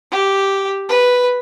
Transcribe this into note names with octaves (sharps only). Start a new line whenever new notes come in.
G4
B4